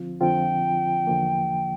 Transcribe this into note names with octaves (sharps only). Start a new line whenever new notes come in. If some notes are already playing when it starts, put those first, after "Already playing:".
Already playing: D3 F3 C4 F4
F2 D3 F3 C4 F4 G5
E2 D3 F3 A#3